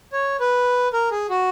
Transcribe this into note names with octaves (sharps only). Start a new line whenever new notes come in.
C#5
B4
A#4
G#4
F#4